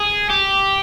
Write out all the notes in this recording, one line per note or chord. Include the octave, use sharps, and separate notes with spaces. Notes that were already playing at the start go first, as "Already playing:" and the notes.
Already playing: G#4
G4